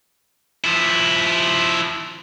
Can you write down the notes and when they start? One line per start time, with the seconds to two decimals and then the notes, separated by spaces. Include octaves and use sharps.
0.64 F3 E4